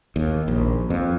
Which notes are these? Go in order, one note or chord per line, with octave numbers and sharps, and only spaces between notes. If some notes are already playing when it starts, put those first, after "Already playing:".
D#2
A#1
F2